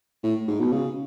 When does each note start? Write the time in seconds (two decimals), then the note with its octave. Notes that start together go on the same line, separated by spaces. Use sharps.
0.23 A2
0.48 G#2
0.60 B2
0.72 C#3